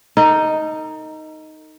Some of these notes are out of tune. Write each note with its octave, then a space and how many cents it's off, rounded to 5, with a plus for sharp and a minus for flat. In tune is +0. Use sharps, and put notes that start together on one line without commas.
D#4 +5 A4 +45